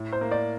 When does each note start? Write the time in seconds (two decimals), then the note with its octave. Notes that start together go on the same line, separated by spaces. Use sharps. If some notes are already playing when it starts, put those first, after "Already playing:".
Already playing: A2
0.13 C5
0.21 A#3
0.31 D5